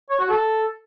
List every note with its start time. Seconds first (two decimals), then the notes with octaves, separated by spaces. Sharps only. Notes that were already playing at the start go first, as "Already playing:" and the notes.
0.10 C#5
0.20 F#4
0.29 A4